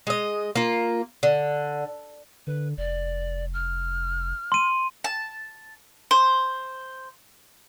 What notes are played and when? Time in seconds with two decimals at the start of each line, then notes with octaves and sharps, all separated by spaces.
0.07 G#3 D#5
0.56 A#3 F4
1.23 D3
2.47 D3 B4
2.77 F1 D5
3.54 F6
4.52 C6 D#7
5.04 A5
6.11 C5